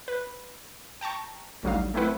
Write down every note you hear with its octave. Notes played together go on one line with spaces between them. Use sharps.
B4
G5 A5 A#5 C#6
A1 D2 F#3 G3 D#4 F5
A3 A#3 C4 E4 B4 F#5